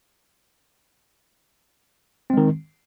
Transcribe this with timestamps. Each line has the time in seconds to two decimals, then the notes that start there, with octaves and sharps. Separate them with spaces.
2.30 C4
2.34 G#3
2.37 D#3